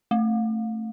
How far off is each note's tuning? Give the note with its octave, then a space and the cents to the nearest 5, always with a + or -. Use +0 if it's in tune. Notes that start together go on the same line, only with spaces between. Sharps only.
A3 +10